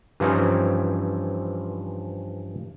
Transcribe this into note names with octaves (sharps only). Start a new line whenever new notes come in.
G2 E3 F3 C4 C#4 D#4